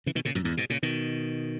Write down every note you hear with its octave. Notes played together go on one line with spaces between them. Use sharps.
C#3 E3
B2 D#3
A#2 C#3
F#2 A#2
E2 G#2
G#2 B2
A#2 C#3
B2 D#3